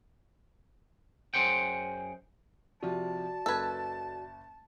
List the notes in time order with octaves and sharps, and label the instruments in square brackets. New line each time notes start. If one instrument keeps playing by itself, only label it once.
[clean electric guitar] F#2 G#4 C5 F#5 G5
[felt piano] C3 F3 [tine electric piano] F#4 D5 [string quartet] A5
[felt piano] F#1 G#6 [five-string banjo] A4 B4